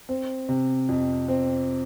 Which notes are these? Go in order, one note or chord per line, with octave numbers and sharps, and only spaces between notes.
C4
C3
F2
C4